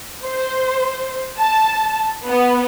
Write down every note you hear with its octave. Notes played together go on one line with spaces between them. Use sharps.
C5
A5
B3